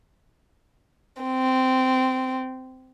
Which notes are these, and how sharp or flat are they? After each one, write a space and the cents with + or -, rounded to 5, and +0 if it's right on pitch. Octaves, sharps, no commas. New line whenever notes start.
C4 -15